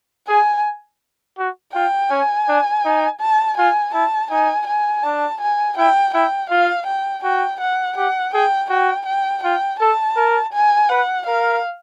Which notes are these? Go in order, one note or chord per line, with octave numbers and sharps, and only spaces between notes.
G#4 G#5
F#4
F4 G5
C#4 G#5
D4
D#4
A5
F4 G#5
E4 A5
D#4 G#5
G#5
D4 A5
G#5
E4 G5
E4 G5
F4 F5
G5
F#4 G5
F#5
G4 F#5
G#4 G5
F#4 G5
G5
F4 G5
A4 A5
A#4
G#5
B4 F#5
A#4 F5